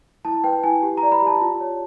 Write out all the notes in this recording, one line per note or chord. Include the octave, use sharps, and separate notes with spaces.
E4 A5
B4 G5
E4 G#5
G4
A#5
D5
B5
G4 A5
F4
C#5